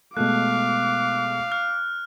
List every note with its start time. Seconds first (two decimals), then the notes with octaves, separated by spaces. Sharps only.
0.17 B2 G#3 A3 F5 D6 F#6
1.52 F6